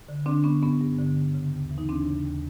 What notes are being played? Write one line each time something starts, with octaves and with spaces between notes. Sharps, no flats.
D3
D3 C4 D4
D3 B3 C#4
G2 B3 C#4
G2
D3
D3
C#3
D#2
E3
D#4
D#2 C4 D4
C#3
D#2